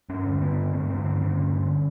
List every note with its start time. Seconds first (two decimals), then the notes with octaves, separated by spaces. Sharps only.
0.09 G2 C#4
0.25 D3
0.41 G2 B3
0.57 D3
0.73 G2 C4
0.89 D3 C4
1.04 G2 C4
1.20 D3 C#4
1.36 G2
1.52 D3